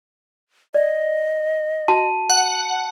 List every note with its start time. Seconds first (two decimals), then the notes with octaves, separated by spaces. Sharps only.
0.74 D5 D#5
1.88 F#4 A5
2.30 F#5